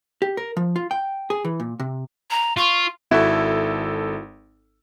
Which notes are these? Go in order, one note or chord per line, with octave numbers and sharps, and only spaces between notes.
G4
A#4
F3
F4
G5
G#4
E3
A#2
C3
A#5
F4 C#6
G#1 E4 F#4 A4 E5